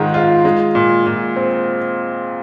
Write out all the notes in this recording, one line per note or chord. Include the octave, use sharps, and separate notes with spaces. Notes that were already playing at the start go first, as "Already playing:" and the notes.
Already playing: G#2 D#3 G#3 F4
F4
G#3
A#2
A#2
C4